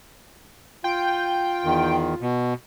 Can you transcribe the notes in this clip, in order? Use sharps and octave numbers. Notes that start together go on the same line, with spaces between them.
F4 G5
E2 D#3
B2